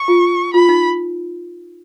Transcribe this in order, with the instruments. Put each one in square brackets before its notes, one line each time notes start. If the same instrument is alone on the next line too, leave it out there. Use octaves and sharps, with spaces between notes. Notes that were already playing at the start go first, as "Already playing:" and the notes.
Already playing: [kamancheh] C#6
[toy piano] F4
[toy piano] F4 [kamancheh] B5
[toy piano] D#4